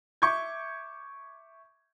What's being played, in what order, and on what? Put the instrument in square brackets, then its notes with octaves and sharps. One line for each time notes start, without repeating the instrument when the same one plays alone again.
[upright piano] E5 C#6 D6 G6 G#6